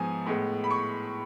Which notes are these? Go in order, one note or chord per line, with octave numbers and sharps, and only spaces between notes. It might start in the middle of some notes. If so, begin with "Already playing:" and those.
Already playing: G#2 F3 B3 G#5
A2 G#3 B3
B5
C#6